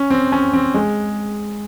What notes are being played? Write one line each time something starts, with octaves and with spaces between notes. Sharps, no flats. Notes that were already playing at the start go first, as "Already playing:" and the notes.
Already playing: C#4
C4
C#4
C4
G#3